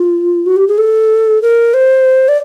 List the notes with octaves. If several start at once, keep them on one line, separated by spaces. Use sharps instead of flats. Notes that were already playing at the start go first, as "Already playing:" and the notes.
Already playing: F4
F#4
G4
G#4
A4
A#4
C5
D5